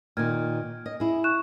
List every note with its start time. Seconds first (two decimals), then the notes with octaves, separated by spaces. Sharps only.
0.17 A#2 D#3 F6 G#6
0.86 D#5
1.00 E4 G#4
1.24 C#6 F#6 E7